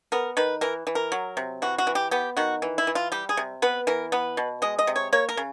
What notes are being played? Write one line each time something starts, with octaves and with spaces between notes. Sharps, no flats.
B3 A#4
D#3 B4
E3 A#4
E3
A#4
F#3
C3
E3 F#4
F#4
E3
G4
B3 G4
D#3 F#4
E3
E4
E3
F4
G3 G4
G#4
C3
B3 B4
E3 A#4
B3 B4
B2
G#3 D#5
D#5
C3
C#5
A#3 C#5
A#4
C#3